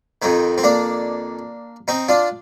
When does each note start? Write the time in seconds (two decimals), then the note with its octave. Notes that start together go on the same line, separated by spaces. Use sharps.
0.22 F2 D#3 C4
0.58 C4
0.63 A#3 D4
1.88 C4 D#4
2.09 D4 F4